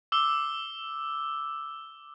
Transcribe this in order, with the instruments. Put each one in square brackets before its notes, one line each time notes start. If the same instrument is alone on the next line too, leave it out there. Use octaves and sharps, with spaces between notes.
[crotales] D6 E6 G7